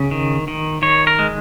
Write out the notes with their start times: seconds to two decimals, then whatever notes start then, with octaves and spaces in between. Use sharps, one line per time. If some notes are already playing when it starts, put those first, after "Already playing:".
Already playing: C#3
0.11 D#3
0.48 D#3
0.82 D#3 C#5
1.07 A#4
1.19 G#3